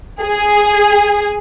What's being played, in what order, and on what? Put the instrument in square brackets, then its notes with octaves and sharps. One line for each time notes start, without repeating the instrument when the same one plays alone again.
[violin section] G#4